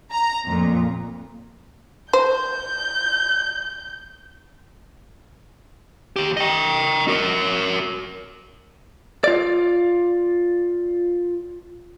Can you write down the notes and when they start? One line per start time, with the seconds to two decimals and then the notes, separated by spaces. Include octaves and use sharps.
0.12 A#5
0.47 F2 A#2
2.13 C5 G6
6.16 D#2 G4
6.37 D#5 G5
7.08 F#4 A#4
9.24 F4 D5